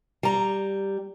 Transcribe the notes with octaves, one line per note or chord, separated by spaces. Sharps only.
G3 A#5